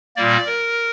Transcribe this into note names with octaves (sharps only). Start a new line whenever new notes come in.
A#2 G3 A#3 D5
A#4